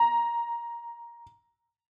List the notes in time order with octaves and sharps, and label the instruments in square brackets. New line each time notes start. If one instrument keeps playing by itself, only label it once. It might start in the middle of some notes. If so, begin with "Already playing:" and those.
Already playing: [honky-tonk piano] A#5